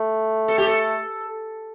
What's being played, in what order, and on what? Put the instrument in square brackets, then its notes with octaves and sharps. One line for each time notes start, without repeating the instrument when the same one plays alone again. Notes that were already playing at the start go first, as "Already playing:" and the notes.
Already playing: [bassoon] A3
[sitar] A4
G4
A4